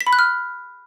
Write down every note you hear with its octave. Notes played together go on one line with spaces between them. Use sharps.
B6
B5
F#6
F6